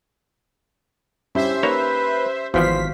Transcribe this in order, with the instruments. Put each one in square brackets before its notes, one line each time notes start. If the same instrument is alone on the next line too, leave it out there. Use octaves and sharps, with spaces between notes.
[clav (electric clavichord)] G2 [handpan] C#4 G4 [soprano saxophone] E4 [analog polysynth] C5 E5
[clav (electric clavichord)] A#3 D#4 C#5 [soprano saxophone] B4
[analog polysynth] G#1 B6 [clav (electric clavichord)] E2 E3 F3 [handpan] F#4 F5 [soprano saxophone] C5